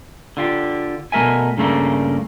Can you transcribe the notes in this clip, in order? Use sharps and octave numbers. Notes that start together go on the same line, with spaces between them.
D3 F4 G4
B2 A3 A#4 E5 G#5
G2 C#3 A3 A#3